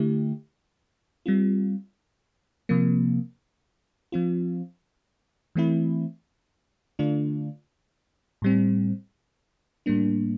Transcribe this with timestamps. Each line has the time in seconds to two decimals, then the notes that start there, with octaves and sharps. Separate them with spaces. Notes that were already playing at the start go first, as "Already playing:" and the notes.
Already playing: D3 A3 E4 G4
1.26 G3 C4 F4
2.69 C3 F3 A#3
4.12 F3 C4 F4
5.55 E3 A3 C4 E4
6.99 D3 A3 D4 F4
8.42 A2 G3 C4
9.86 A2 G3 A#3 D4